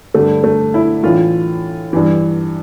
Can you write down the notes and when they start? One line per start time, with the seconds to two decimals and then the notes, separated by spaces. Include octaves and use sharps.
0.14 G2 D3 A3
0.44 A3
0.74 E4
1.03 A2 E3 F4
1.93 G2 E3